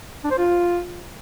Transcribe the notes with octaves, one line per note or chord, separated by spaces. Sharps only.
D4
C5
F4